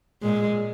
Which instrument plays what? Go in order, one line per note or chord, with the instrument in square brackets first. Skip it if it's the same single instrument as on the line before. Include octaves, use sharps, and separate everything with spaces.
[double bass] A#2 [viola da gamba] G#3